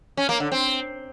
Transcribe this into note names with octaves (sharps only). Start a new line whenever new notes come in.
C#4
A#3
D3
C4